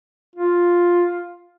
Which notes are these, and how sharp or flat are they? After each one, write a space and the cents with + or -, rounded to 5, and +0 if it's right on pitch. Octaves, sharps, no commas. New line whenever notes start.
F4 +5